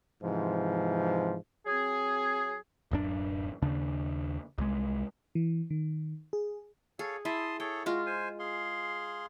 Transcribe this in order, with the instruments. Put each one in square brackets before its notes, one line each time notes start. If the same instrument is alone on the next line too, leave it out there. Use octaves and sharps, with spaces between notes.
[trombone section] G#2 C3 E3 F3
[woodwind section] F#3 C4 G#4
[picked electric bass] D1 F#2 D4
D#2 C#3 D4
C2 G#3
[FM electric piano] E3
D#3
G#4
[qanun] G#4 [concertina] A4 C#5 F5
[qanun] E4 [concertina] A5 C6 D#6
[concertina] G#4 A4 C#5 [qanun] G5
[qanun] G#3 F4 [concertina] F#4
[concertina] C5 G#5
G#4 F5 C6